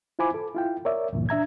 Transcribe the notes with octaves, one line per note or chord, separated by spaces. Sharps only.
E4 F4 C5 G#5 B5 D6
A4
E4 F4 G5
A#4 C#5 D5 E5
D2 G2 A#2 E3
D4 E5 A#5 G#6